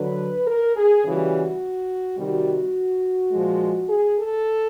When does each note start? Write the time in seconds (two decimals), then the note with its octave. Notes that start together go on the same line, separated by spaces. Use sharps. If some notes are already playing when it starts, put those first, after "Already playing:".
Already playing: D3 F#3 B4
0.47 A#4
0.76 G#4
1.04 C#3 E3 G3 F#4
2.18 C3 D#3 G3 F#4
3.32 A#2 F3 G#3
3.89 G#4
4.17 A4